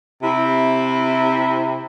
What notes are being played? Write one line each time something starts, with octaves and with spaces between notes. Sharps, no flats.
C3 E4